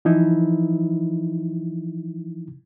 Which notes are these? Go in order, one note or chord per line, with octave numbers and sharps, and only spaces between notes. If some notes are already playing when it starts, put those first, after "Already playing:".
E3 F3 D#4 E4